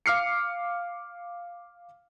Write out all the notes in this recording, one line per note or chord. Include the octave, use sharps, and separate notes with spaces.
F5 D6 F6 C7 C#7